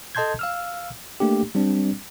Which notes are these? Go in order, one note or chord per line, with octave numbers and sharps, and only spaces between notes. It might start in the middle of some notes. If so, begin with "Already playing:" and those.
A4 D#5 A5 C6 G6 G#6
F5 E6 F6
A3 A#3 D4 G4
G3 C4 D4